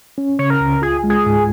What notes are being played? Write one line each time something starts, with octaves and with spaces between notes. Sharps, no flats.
C#4
C#3 C#5
A#4
C#2
F4 G#4
G#3
G#4
G#2